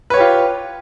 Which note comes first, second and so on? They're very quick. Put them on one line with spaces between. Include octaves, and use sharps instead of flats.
B4 C#5 G4 F4